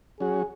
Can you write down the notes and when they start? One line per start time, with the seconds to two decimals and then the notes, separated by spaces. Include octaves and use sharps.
0.20 F#3 C#4 F#4 G#4